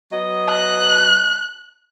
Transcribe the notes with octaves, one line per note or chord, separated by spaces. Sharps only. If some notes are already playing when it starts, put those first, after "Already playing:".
F#3 B3 D#5
F#6